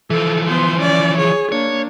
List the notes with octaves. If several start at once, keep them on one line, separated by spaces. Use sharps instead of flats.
E3 F3 A4
B3 C5
C#4 D5
G#4 C#5
A#3 D4 C#5